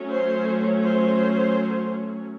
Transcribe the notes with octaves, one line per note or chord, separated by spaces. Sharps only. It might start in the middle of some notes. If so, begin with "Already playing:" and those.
Already playing: F#3 A3 C#4
C5
C5